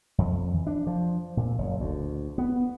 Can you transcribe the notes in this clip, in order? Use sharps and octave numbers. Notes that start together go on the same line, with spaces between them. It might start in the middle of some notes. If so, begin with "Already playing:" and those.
F2
E3
D4
F3
A#2
F#1
D2
B3